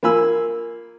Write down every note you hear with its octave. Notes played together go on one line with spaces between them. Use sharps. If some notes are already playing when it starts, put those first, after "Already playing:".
A#3 F4 G#5 B5 E6